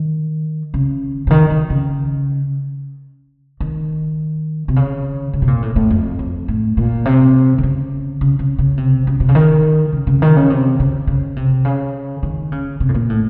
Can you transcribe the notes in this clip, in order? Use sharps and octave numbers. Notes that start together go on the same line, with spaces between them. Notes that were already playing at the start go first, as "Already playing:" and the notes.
Already playing: D#3
C#3
C#3
D#3
D#3
C#3
D#3
C3
C#3
C#3
C3
A#2
A2
A2
F2
F2
A2
A#2
C3
D#3
C#3
C#3
C#3
C#3
C3
C#3
C3
C#3
D#3
C#3
C#3
D#3
C#3
C3
C#3
C#3
C3
C#3
D#3
C#3
C3
A2
A#2
A2